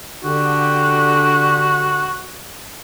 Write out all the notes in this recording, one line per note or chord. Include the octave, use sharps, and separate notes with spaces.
D3 D4 F#4 G4